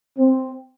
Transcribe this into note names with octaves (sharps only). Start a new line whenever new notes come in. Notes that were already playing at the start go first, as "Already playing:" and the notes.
C4